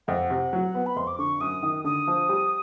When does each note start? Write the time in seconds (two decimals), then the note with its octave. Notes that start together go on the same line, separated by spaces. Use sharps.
0.08 F2 F#5
0.30 C3
0.53 F#3
0.75 B3
0.86 B5
0.96 F2 C6
1.07 D6
1.18 D3 C#6
1.40 F#2 D#6
1.63 D#3
1.84 D3 D#6
2.07 F3
2.29 G3